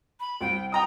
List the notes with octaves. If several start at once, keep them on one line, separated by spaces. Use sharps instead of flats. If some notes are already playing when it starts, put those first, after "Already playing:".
B5
C2 G5
D#5 G5 A#5 D#6